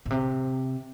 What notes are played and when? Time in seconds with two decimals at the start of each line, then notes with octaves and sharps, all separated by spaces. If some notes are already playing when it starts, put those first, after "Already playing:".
0.06 B2
0.10 C3